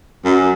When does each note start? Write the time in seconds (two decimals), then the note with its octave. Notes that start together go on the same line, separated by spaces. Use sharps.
0.25 F#2